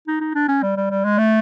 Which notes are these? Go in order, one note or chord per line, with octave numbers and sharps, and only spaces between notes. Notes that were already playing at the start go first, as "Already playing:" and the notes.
D#4
D#4
D4
C#4
G3
G3
G3
G#3
A3